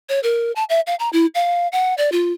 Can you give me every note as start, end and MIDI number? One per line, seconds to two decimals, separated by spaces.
0.09 0.20 73
0.23 0.52 70
0.56 0.64 81
0.70 0.81 76
0.87 0.95 77
0.99 1.09 82
1.13 1.26 64
1.35 1.68 77
1.72 1.94 78
1.98 2.10 74
2.12 2.33 65